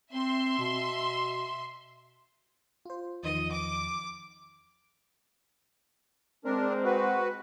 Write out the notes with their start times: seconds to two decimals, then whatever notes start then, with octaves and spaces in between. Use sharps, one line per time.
0.13 C4 E5 C6
0.59 B2
2.85 F4 C5
3.23 E2 D#3 F3 D#5
3.52 D6
6.45 G#3 C4 D4 A#4
6.85 F#4 B4